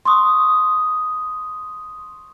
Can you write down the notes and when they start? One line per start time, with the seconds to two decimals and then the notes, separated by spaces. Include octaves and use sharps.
0.05 C6 C#6 D#6